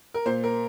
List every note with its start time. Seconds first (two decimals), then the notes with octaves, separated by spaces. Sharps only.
0.14 A#4
0.26 A#2 C5
0.44 A#4